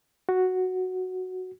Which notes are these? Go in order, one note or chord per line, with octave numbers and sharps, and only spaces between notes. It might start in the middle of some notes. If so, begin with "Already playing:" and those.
F#4